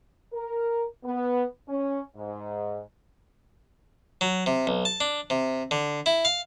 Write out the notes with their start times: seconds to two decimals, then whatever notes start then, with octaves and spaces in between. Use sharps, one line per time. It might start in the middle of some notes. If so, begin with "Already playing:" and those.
0.32 A#4
1.03 B3
1.67 C#4
2.16 G#2
4.21 F#3
4.46 C3
4.67 B1
4.85 A5
5.00 D4
5.30 C3
5.71 D3
6.06 E4
6.25 F5